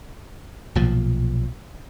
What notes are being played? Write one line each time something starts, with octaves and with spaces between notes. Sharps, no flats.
B1 A#2 F3